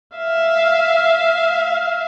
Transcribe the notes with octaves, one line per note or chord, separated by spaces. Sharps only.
E5 F5